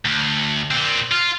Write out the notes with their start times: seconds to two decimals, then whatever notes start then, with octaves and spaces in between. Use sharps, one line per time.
0.05 D2
0.71 A#2 C4
1.12 F4